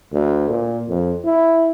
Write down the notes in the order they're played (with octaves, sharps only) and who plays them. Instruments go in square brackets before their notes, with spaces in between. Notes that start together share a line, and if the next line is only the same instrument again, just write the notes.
[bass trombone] D2
A#2
F2
E4